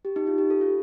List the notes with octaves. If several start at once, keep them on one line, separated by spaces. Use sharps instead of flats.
G4
D#4
F4
G4
A4
F4